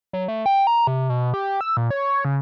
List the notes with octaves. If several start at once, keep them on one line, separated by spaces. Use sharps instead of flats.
F#3
A3
G5
A#5
C3
B2
G4
E6
A#2
C#5
C#3